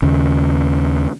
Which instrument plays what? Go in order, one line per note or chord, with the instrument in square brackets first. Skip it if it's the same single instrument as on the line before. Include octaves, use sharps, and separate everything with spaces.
[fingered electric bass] D#2 C#3